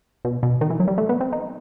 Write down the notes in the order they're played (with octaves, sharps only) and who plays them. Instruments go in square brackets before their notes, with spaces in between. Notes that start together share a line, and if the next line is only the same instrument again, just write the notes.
[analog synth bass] B2
B2
D#3
E3
F#3
G3
A3
B3
C4
D#4